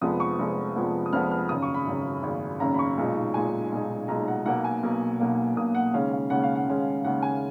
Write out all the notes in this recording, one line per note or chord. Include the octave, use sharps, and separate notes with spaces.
F1 F2 F3 G#3 B3 D#6
C#6
F1 F2 F3 G#3 B3
F1 F2 F3 G#3 B3
D#6
F1 F2 F3 G#3 B3 F6
F6
G#1 F#2 C#3 D#6
C#6
B5
G#1 F#2 C#3
G#1 F#2 C#3
G#1 F#2 C#3 A#5
B5
C#6
B1 A#2 G#3 D#4
B1 A#2 G#3 D#4 G#5
B1 A#2 G#3 D#4
B1 A#2 G#3 D#4 A#5
F#5
B1 B2 A#3 F#5
G#5
B1 B2 A#3
B1 B2 A#3
B1 B2 A#3 D#6
F#5
D#2 C#3 G#3 C#4 F5
F5
D#2 C#3 G#3 C#4 F#5
F5
F#5
D#2 C#3 G#3 C#4
D#2 C#3 G#3 C#4 F#5
G#5